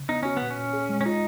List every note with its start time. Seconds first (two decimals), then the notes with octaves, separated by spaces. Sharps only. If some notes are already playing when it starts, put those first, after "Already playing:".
Already playing: C#3
0.09 B3 D#4
0.23 C#4 F#4
0.37 A#2 B3
0.50 C#4
0.58 A#2
0.73 G#4
0.89 G#3
1.01 C#4
1.06 D#4 F4